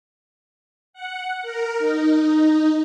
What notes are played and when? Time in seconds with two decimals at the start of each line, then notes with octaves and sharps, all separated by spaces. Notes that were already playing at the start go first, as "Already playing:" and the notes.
0.93 F#5
1.42 A#4
1.79 D#4